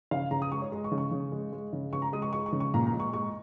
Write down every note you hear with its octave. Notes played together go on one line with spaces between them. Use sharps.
C#3 F5
C#3 A#5
D#6
G#3 C#6
C#5
G#3
C#6
C#3
C#6
C#3
G#3
G#3
C#3
C#3 C#6
A#5
G#3 D#6
C#6
G#3 C#6
C#6
C#3
C#6
A#2 A#5
A#5
G#3
C#6
G#3 C#6